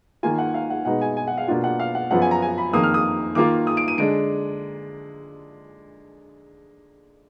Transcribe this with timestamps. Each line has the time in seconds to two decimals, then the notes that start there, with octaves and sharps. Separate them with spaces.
0.23 D#3 A#3 F4 G#5
0.39 F#5
0.54 F5
0.70 F#5
0.85 B2 G#3 B3 D#4 F#5
1.01 G#5
1.17 G#5
1.28 F#5
1.38 F5
1.48 B2 A#3 D4 F4 F#5
1.64 F#5
1.80 F5
1.95 F#5
2.11 F#2 F3 B3 F4 F#5
2.22 G#5
2.31 A#5
2.42 G#5
2.58 B5
2.73 F2 D#3 A#3 D#6
2.83 F6
2.94 D#6
3.35 D#3 A#3 F4 D6
3.67 D#6
3.77 D7
3.88 D#7
3.98 D3 G#3 D4 D7